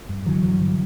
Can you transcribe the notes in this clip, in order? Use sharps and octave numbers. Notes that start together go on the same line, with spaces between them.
G2
D3 E3 F#3
G2
D3